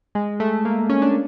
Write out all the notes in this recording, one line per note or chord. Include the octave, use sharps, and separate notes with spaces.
G#3
A3
A#3
C#4
D4